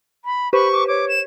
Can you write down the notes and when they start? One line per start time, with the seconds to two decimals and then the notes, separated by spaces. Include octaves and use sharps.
0.25 B5
0.53 G4 B4 C5 B5 C#6
0.72 D6
0.88 C#5 D6
1.09 E7